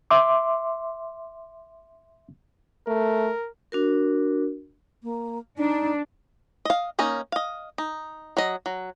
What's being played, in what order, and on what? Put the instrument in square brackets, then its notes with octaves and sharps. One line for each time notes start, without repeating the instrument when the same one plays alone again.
[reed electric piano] E5 C6 D6
[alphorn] A3 [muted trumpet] A#4
[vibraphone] D4 F#4 A#4
[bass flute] A#3
[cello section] D4 [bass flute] D#4
[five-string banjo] D#5 F5
A#3 C#4 D#4 D#5
D#5 F5
D#4
F#3 D#5
F#3